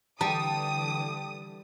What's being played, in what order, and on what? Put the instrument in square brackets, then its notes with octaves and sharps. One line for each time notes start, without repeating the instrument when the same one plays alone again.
[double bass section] D3 E3 [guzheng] G3 [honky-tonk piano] G5 A5 [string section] D#6